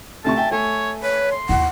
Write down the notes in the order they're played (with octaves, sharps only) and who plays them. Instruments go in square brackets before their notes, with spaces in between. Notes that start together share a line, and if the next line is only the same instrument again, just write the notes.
[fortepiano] D2 C3 C#6 [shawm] A5
[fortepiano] E5 G5 G#5
[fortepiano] A3 G#5 [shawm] C#5
[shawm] B4 [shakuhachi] C#5
[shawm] C6
[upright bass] D#2 E4 [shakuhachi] F#5